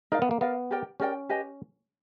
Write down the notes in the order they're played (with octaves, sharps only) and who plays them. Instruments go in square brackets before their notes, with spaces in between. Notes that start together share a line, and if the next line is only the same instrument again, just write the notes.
[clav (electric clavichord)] D#4 [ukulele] A#4 D5 F5
[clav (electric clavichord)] B3
A#3
[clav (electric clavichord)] B3 [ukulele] A#4 D5 F5
[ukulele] G4 A#4 D5 G5
[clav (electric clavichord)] C#4 [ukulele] G4 A#4 D5 G5
[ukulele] G4 B4 D#5 G#5